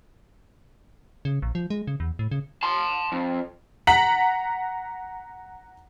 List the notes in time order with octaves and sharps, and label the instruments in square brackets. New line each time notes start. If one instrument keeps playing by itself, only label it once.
[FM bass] C#3
A#1
F3
G#3
C#3
E2
A2
C#3
[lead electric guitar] A5 C6
F2
[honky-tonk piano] F#5 A#5 B6 F#7